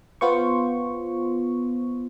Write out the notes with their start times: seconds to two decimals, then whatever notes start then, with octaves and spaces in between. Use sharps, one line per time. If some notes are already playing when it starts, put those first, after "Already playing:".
0.21 B3 F4 C5 C#6